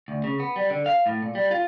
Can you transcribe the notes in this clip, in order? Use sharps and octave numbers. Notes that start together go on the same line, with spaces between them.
D2
C#3
B3
G3
D3
F5
A2
A#2
G3
F4